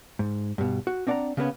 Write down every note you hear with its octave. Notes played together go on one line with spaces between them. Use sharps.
G#2
G2 B2
F#4
C4 D4 D5 F5 F#5 A#5
C#3 A#3 B3 C#4